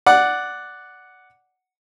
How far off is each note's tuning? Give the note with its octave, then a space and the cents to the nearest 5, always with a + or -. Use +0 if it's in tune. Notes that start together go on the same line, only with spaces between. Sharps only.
D5 +0 F#5 +0